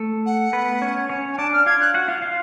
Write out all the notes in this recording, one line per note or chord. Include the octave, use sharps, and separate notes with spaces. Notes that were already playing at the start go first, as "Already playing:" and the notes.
Already playing: A3 A4
F#5
B3 B4
C#4 C#5
C#4 C#5
G#5
D4 D5 A5
F6
F4 F5 G#6
F#6
F#4 F#5
F4 F5
F4 F5